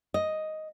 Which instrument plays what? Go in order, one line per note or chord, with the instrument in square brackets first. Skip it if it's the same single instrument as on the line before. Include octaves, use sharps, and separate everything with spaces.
[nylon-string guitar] D#5